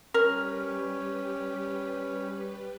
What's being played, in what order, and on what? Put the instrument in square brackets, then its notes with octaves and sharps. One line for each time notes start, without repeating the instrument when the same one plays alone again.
[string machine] G3 G4 B4 [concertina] C#4 [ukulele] A#4